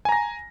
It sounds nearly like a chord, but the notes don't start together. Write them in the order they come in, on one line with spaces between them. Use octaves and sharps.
G#5 A#5 A#6